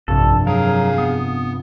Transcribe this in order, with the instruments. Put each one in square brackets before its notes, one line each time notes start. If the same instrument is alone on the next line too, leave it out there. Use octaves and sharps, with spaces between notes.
[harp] F1 G2 [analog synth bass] A#1 [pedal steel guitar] A4
[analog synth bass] F#3 [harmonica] G#4 F5 [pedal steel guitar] A#4
[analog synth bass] B3 [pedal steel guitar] D#6